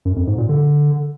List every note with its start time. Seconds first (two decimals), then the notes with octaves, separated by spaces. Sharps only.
0.05 F#2
0.16 F2
0.27 G#2
0.38 A#2
0.49 D3